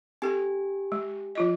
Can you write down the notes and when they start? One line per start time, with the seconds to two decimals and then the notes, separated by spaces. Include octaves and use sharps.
0.22 C4 G4 A4 G#5
0.92 G#3
1.35 F3 F4 D#5